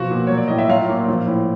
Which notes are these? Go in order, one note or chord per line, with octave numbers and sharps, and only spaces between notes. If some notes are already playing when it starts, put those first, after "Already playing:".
Already playing: B2 F3 F#4 F#5
A#2
F#3 C#5
D5
A2 D#5
E5
F#3 F4 F5
A#2
F3
A2